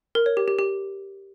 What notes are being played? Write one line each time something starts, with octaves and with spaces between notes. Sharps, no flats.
A#4
C#5
G4
G4
G4